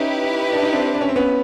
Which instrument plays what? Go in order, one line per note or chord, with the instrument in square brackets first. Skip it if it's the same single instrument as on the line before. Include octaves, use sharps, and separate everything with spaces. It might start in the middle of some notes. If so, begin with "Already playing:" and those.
Already playing: [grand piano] C#4 D#4 [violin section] E4 G4 B4
[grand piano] D4
D#4
C4 D4
D4
C#4
C4
B3 C#4